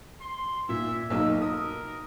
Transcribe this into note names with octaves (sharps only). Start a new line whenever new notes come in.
C6
A#2 E5
B1 A#3 D#4 E6
A#4 D#6